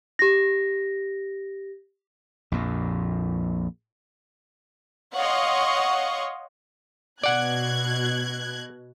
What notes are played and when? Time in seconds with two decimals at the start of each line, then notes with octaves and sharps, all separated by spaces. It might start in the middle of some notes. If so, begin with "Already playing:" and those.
0.19 G4 A#6
2.52 A#1 F2 A#2
5.16 C#5 D#5 F5 F#5 C6 C#6
7.23 B2 D5 F#5 F#6 G#6